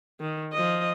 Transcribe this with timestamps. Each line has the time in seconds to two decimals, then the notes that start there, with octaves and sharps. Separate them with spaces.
0.20 D#3
0.53 F3 D#5